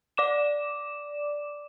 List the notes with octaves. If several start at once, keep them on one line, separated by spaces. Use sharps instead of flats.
D5 D6 E7